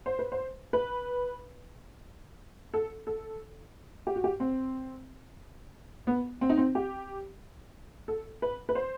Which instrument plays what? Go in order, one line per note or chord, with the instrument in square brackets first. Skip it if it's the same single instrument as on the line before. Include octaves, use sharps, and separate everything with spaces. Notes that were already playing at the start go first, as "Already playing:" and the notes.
[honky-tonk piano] C5
B4
C5
B4
A4
A4
G4
F#4
G4
C4
B3
C4
D#4
C4
G4
A4
B4
B4
C5